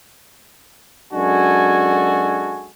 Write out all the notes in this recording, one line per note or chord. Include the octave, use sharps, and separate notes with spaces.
F#2 G#3 D4 F#4 A4 G#5